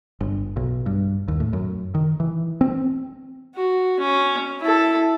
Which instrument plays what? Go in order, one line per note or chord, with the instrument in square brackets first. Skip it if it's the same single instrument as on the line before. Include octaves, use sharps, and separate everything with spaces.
[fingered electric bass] G1
B1
G2
D#2
A2
F#2
D#3
E3
C4
[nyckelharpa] F#4
C#4
E4 A4